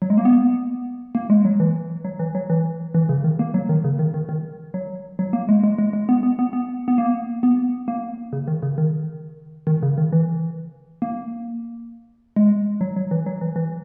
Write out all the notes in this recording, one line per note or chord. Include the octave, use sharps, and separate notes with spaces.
F#3
G#3
A#3
B3
A#3
G#3
F#3
E3
F#3
E3
F#3
E3
E3
C#3
D#3
A#3
F#3
D#3
C#3
D#3
D#3
D#3
F#3
F#3
A#3
G#3
G#3
G#3
G#3
B3
B3
B3
B3
B3
A#3
B3
A#3
C#3
D#3
C#3
D#3
D#3
C#3
D#3
E3
A#3
G#3
F#3
F#3
E3
F#3
E3
E3